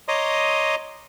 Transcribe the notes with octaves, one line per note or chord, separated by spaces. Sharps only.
C#5 D#5 A#5 C6 D6 D#6